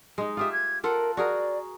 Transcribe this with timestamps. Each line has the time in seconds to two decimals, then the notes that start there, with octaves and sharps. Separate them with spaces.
0.18 G#3 D#4
0.37 F4 G4 E5 D#6
0.53 G#6
0.84 F4 A4 A#4 F#5
1.17 F#4 G#4 A#4 D5